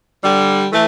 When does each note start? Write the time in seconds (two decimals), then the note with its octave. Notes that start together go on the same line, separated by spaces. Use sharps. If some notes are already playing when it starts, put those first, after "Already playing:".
0.23 D3 G3
0.71 E3 A3